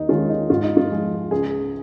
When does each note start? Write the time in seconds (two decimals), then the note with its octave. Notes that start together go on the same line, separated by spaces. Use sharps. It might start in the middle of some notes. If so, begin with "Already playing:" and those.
Already playing: D#2 D#4
0.09 D#3 G#3 C#4 F4
0.29 D#4
0.50 G#2 F4
0.63 D#4
0.77 F4
0.90 F3 G#3
1.31 C#2 G#4